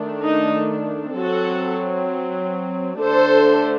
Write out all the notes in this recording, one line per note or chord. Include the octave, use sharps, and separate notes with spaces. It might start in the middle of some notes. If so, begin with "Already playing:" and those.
Already playing: D#3 A3 D4
D#4
F#3 C4 F#4 A4
D3 A3 D4 A4 C5